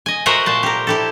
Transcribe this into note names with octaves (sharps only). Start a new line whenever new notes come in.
D#5 G#5
F#4 A#4 C5 D#5 E5 F#5
A#2 C5 A5
G4 A#4
E4 G4 A4